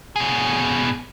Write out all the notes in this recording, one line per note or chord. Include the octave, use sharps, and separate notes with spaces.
B2 G#4